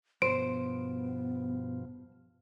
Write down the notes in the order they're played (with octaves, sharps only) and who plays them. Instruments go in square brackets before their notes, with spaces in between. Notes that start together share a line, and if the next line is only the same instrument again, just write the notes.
[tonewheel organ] G2 B2 F3 [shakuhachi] B3 [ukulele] C5 [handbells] D7